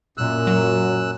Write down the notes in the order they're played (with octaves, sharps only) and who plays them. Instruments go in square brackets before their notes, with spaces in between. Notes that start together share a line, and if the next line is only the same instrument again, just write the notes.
[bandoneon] F#2 E6 F#6 [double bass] A#2
[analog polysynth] F#3